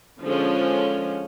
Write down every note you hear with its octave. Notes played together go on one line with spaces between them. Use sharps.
D3 F3 G#3 C#4